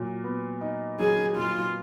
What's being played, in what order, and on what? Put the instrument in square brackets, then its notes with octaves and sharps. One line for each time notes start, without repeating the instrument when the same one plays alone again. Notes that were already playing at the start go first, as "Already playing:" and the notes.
Already playing: [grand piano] A#2 F#3
B3
D#4
[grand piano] F#3 [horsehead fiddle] G#4
[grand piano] A#2 [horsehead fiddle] F4